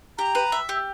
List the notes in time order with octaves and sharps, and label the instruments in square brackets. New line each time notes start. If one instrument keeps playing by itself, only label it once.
[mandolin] G4 [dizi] A#5
[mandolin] B4
E5
G4